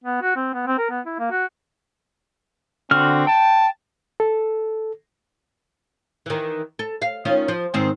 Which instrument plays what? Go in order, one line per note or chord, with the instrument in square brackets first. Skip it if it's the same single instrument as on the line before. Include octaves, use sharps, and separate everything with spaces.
[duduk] B3
F#4
C4
B3
C4
A#4
B3
E4
A#3
F#4
[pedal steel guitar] D3 F#4 F6 [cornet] C4
[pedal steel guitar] G5 [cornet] A5
[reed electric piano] A4
[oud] D#3 E3
A4
F5
D#3 C#4 F4
F3
G#2 D#3 C4